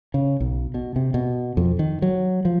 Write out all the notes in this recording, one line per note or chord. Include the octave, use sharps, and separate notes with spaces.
C#3
B1
B2
C3
B2
F2
D#3
F#3
F3